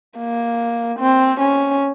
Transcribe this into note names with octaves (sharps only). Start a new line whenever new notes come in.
A#3
C4
C#4